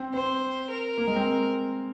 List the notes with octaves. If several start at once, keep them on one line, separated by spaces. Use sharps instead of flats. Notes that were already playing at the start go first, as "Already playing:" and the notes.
Already playing: C4
C4 C5
A#4
A#3
G#3
C4